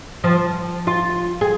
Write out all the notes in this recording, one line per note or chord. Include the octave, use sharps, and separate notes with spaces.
F3
F4
G#4